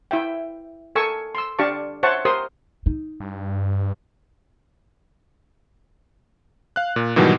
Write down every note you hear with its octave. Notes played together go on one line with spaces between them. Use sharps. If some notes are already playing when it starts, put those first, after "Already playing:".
E4 E5 G5
A4 A#4 G#5 C#6 E6
C6 E6
D4 G4 D5 F5 A5 C#6
C5 C#5 E5 F#5 A5 C#6
G4 A#4 C5 C6 D#6
D#4
G2
F5 F#6
A#2
G#2 B2 D#3 E3 F#3 G3